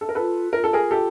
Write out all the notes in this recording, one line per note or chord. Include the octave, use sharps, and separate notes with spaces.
A4
A#4
F4 A4 B4
F4 A#4
A4
G#4 A#4
G4 A4